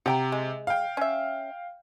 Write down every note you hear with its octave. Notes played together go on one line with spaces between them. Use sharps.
C3 F#5 G5 A#5
G#3
F5 G5
C#4 E5